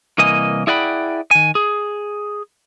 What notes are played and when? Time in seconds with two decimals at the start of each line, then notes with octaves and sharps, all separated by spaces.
0.18 C2 E3 A#3 D#5 G#5
0.67 E4 G#4 D5 F#5 G5 B5
1.31 D#3 G#5
1.55 G#4